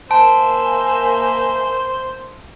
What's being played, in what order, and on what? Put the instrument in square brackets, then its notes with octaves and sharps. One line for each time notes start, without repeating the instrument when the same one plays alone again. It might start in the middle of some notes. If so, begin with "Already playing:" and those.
[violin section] A#3 E5 [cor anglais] C5 [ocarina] G#5 [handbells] A5